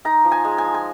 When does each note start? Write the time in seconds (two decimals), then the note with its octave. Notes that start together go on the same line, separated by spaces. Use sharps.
0.05 D#4 A#5
0.25 F3
0.32 G#5
0.44 G#3
0.58 G#5
0.65 F3
0.74 G#5